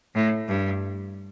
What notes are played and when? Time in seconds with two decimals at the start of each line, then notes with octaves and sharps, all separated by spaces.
0.15 A2
0.48 G2